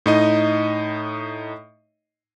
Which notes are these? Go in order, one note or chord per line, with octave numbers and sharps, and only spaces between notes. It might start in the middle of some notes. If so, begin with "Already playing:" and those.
A2 D#4 D#5